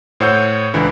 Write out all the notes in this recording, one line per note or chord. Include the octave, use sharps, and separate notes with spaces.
A2 C5 C#5 F#5 E6 G6
C#2 D3 E3 E4